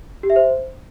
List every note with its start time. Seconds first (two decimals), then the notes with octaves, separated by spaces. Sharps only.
0.23 G4
0.30 E5
0.36 C5